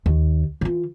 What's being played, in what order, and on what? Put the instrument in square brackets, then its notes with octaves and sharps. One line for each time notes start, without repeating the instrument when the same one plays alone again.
[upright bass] D#2
E3 F4